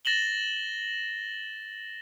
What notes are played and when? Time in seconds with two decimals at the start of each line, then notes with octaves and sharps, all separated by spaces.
0.05 A6 A#6 E7 F#7 G7